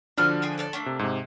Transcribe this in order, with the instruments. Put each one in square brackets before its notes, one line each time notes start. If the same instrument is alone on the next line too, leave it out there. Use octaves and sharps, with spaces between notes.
[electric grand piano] D3 F3 D4 [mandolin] F#4 B5 F6
[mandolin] G#4 G5 G#5
A4 C#5 D5
A3 A#3 D4
[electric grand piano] C3
G#2 C3